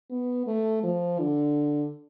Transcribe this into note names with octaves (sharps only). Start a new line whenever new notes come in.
B3
A3
F3
D3